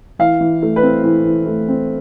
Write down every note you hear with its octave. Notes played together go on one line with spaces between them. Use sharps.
E3 F5
E3
A3
B4
C4
E3
E3
A3
C4